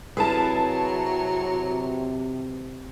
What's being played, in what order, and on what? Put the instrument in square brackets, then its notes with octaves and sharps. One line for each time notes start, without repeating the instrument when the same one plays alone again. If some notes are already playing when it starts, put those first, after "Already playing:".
[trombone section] C3 [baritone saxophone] F#3 [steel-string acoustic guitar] E4 A#4 B4 [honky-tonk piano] G#4 A5